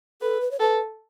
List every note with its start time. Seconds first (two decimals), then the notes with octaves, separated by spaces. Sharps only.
0.22 A4 B4
0.41 B4
0.51 C#5
0.60 A4 B4